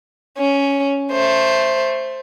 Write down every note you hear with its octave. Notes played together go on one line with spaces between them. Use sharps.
C#4
A3 C5